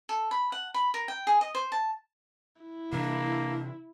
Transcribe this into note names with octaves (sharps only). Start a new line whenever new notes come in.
A4
B5
F#5
B5
A#4
G5
G#4
D#5
C5
A5
E4
C3 E3 A#3 D4